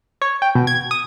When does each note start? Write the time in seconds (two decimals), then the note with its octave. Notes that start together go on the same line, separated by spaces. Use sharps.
0.22 C#5
0.42 G5
0.55 B2
0.67 G#6
0.91 D#6